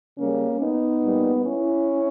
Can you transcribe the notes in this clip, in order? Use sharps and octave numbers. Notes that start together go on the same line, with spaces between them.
C#3 G3 A#3 C#4
B3 D#4
A#2 G3
C#4 E4